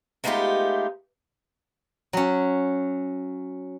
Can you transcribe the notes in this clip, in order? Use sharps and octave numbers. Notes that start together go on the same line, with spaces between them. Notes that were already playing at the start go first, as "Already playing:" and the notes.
G#3 A3 B3 D#4 F4 G4
F#3 C#4